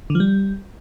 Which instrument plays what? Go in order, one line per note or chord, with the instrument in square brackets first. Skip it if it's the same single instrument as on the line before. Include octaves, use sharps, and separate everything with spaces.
[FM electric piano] D3
F3
G3